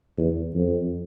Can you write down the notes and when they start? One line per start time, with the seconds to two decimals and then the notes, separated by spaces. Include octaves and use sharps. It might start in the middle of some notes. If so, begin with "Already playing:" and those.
0.17 E2
0.55 F2